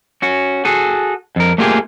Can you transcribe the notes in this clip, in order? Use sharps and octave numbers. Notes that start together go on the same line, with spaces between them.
C#4 F#4
F#4 G#4 A4
F2 A#4
A3 A#3 C4 F4 G4 G#4